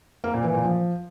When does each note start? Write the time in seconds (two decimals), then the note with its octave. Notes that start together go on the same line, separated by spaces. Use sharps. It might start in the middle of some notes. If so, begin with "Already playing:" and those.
0.24 A#3
0.34 A#2
0.44 E3
0.54 A#2
0.64 F3